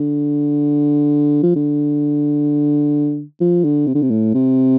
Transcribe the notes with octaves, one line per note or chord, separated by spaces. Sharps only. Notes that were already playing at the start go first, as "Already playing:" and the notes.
Already playing: D3
F3
D3
F3
D3
C3
D3
C3
A2
C3